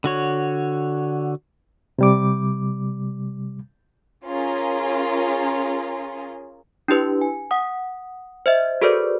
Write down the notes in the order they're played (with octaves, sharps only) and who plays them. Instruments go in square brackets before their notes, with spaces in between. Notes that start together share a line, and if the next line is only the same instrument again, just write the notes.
[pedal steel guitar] D3 F#4 C#5
[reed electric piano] C3 G3 D6
[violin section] C#4 F4 G#4 A#4
[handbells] D4 E4 G4 B4
G#5
F#5 D#6
C5 D#5 E5
F#4 G#4 A4 B4 C5 D5